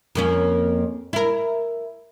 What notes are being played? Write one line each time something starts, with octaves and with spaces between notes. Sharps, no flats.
F2 A#3 C#4
E4 A#4